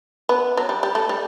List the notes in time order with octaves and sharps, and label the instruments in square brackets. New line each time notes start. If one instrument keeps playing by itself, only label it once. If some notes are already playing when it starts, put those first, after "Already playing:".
[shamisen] B3
F#3
G3
G3
A3
G3